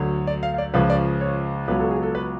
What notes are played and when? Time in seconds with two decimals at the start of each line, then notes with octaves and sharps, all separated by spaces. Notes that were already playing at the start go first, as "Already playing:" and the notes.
Already playing: D2 D3 F#3
0.27 D5
0.43 F5
0.54 F5
0.58 D5
0.74 C#2 C#3 F3 B4
0.90 D5
1.21 C#5
1.68 C#2 B2 F#3 B4
1.80 A4
1.91 G#4
2.03 A4
2.15 B4